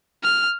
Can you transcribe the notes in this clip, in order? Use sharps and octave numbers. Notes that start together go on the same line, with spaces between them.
F6